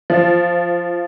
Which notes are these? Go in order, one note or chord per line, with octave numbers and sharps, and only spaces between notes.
F3